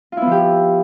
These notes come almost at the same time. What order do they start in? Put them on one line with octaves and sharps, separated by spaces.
F4 E4 B3 F3 G4